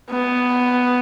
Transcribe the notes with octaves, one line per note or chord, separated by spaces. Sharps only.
B3